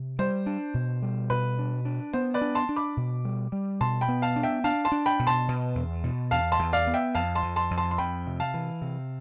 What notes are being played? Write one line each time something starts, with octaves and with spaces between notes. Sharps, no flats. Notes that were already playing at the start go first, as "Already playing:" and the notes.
Already playing: C3
G3 C5
D4
B2
G3
B2 B4
D4
D4
B3 C5
B4 D5
D4
A5 C6
D4
B5 D6
B2
G3
G3
B2 A5 C6
G5 B5
B3
F5 A5
D4
E5 G5
D4 F5 A5
A5 C6
D4
G5 B5
B2
A5 C6
B2
E2
B2
E2 F5 A5
A5 C6
E2
D5 F5
B3
E5 G5
F2 F5 A5
A5 C6
F2
A5 C6
F2
A5 C6
C6
F2 G5 B5
C3
F5 A5
E3
C3